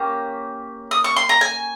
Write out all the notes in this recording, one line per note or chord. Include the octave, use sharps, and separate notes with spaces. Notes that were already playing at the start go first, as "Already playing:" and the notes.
Already playing: A#3 C#4 G4 A#5
D#6
C#6
C6
A#5
G#5